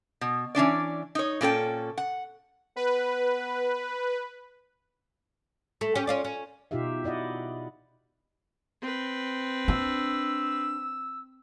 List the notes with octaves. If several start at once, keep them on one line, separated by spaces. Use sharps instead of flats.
B2
E3 C#4 D4 D5
D#4 C#5
A#2 C#4 A4 G5
F#5
B3 B4
A3
C#4 G4
C#4 F4 D5
C#4
B2 D#4 F4 G4 E5 F5
E4 D5 D#5 F#5
C4 B4
D4 E6